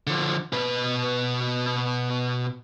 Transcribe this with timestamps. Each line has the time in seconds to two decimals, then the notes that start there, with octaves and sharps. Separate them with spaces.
0.07 D3 F3
0.53 B2 B4